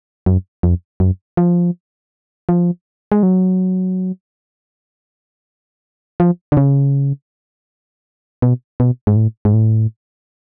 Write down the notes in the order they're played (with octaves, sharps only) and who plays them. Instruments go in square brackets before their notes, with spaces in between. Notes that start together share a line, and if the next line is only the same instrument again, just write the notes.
[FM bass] F#2
F2
F#2
F3
F3
G#3
F#3
F3
D3
C#3
B2
B2
G#2
A2
G#2
A2